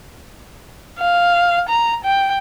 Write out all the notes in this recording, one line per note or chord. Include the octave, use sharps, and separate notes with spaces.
F5
A#5
G5